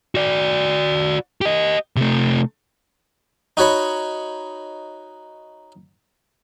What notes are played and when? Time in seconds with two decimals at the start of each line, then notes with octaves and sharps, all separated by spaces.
0.15 F#4 D5
1.41 G4 D#5
1.96 C3 A3
3.57 D#4 F#4 C#5 B5